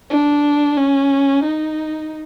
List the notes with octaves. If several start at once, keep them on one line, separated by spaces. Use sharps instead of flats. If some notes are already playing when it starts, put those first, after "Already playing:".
D4
C#4
D#4